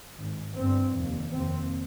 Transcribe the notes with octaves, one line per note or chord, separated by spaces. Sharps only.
G#1 G#2
G1 G2 C4
F1 D#2
F1 D#2 C4